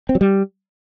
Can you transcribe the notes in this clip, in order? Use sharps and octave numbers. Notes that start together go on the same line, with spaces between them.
C4
F#3
G3